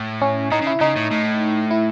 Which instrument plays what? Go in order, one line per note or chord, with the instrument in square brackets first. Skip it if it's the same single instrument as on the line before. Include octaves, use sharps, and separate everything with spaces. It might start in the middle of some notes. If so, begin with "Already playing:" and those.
Already playing: [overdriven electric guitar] A2
[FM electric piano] C#4
[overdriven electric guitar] A2 [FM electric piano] D#4
[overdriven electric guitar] C#3 [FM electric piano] E4
[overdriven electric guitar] C#3 [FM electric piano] D#4
[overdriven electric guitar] A2
A2
[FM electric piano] E4